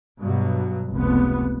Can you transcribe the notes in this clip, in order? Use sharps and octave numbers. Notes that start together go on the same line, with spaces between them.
G2 B2 F#3
F1 C#2 B3